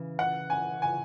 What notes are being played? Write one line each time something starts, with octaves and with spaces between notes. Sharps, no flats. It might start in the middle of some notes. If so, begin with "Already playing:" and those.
Already playing: C#3 E3
F#5
G#5
G#5